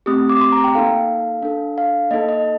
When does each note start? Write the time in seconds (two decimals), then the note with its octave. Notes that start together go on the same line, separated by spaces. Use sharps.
0.06 A3 C4 G4 D#6
0.29 D6
0.41 C6
0.52 A#5
0.64 G5
0.75 A#3 D#4 A4 F5
1.42 D4 A4
1.78 F5
2.11 A#3 D#4 A4 D#5
2.29 D#5